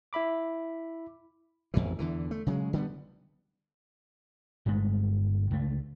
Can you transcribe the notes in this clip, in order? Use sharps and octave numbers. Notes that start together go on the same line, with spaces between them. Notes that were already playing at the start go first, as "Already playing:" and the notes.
E4 E5 B5 D6
A1 F2 B2 E3
E2 D3 E3
A3
C#3 F#3 G#3
D3 G3 G#3 B3
G1 G2 G#3 A3
C#2 A3